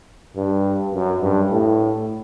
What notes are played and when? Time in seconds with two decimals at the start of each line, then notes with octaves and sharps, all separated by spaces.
0.36 G2
0.93 F#2
1.21 G2
1.50 A2